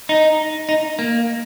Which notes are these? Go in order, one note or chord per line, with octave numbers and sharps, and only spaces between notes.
D#4
D#4
A#3